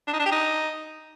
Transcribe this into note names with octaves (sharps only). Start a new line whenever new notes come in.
D4
D#4
D4
G4
D#4